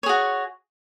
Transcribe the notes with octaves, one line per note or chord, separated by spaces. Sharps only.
F#4 G#4 C#5